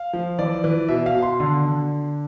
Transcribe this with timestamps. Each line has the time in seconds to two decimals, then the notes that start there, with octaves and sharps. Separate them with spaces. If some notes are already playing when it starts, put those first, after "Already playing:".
Already playing: F5
0.13 F3
0.39 E3 D5
0.64 E3
0.88 B2 E5
1.06 F5
1.14 B2
1.22 C6
1.40 D3 C6
1.65 D3